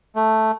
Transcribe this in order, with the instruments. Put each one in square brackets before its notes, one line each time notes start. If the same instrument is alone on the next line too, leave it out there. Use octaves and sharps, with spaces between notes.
[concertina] A3